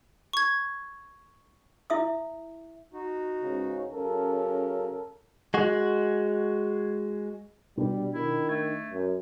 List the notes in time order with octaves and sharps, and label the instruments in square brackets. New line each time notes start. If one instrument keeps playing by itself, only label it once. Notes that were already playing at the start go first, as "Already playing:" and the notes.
[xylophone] C#6 G#6
[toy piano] E4 E5 D#6
[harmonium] D#4 F#4
[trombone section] C#2 G#2 C#3
[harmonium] C#3 F#3 [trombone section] C#4 A4 A#4
[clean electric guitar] G#3 F#4
[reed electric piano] B2 [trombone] G3 [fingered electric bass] D4
[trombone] D#3 [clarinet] E4
[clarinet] A3 [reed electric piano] G#6
[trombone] F#2